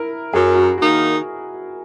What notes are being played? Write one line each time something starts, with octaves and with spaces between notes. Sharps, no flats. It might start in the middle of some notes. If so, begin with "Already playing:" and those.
Already playing: E4 A#4
F#2 G#4
F#4
D#3 A#3 D#4 F#4